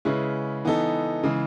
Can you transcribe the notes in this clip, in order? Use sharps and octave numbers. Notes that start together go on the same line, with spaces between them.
C#3 G#3 C#4 E4 B4
E3 B3 D#4 A4
C#3 E3 G#3